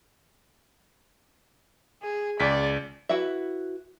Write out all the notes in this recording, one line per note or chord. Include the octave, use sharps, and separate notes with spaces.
G#4
C#2 D5 B6
E4 F#4 B4 E5